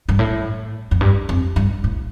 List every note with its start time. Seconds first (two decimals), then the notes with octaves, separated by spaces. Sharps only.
0.09 G2
0.19 A2
0.91 F2
1.01 G2
1.29 F2
1.56 G2
1.84 A2